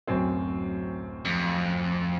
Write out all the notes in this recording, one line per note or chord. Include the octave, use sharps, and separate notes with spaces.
D1 F#2 C4
F2